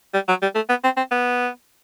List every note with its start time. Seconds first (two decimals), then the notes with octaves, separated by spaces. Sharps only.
0.14 G3
0.28 F#3
0.42 G3
0.55 A3
0.69 B3
0.84 C4
0.97 C4
1.11 B3